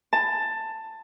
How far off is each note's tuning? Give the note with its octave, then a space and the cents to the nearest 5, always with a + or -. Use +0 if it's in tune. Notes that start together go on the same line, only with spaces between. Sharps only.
A5 +15